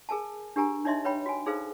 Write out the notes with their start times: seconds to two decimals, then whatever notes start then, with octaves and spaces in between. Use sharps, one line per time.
0.09 G#4 A#4 G#5 A5
0.56 D4 G4 A#4 G#5 A#5
0.84 D4 D#4 C#5 D#5 E5 C6
1.05 B4 C#5 G5 B5
1.26 F#4 G#5
1.46 D#4 G#4 A4 B4 C5 F5